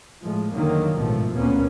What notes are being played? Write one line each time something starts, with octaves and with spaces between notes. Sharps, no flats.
A2 F3 G#3
F2 D3 D#3 F#3 A#3
A1 G#2 B2 F3 A3
D2 A#2 A#3 B3 C#4